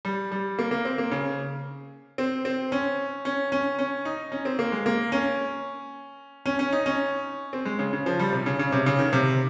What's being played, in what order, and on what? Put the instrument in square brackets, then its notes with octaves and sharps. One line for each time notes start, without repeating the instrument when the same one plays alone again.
[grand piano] G3
G3
A#3
A#3
C4
A#3
C#3
C4
C4
C#4
C#4
C#4
C#4
D#4
C#4
C4
A#3
G#3
A#3
C#4
C#4
C#4
D#4
C#4
C4
G#3
C#3
C#3
F3
G3
C3
C#3
C#3
C3
C#3
D#3
C3